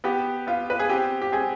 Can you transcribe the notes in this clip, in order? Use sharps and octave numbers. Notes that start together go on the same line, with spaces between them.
B3 G4
B3 F4
B4
G#4
C4 G4
G4
C4 G#4